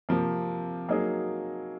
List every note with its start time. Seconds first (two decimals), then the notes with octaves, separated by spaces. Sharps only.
0.09 C3 F3 A#3
0.88 F#3 A#3 D#4 G#4